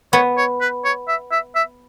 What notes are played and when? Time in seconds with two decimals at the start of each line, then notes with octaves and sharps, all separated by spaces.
0.13 B3 C#5
0.37 C#5
0.61 B4
0.85 C#5
1.08 E5
1.32 E5
1.55 E5